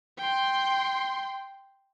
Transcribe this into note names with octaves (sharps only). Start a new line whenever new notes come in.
G5 C6